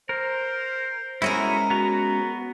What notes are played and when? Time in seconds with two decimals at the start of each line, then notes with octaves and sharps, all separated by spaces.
0.09 A#4 C5
1.22 G#3 C#4 E4 F#4 G#4 A#4
1.70 B3 F#4 A#5